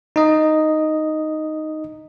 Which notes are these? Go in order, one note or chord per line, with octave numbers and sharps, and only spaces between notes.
D#4 D#5